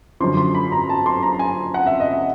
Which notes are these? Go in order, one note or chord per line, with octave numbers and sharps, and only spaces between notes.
F#2 D3 F3 C6
C6
B5
A#5
A5
C6
A#5
G#5
F#5
E5
D#5
E5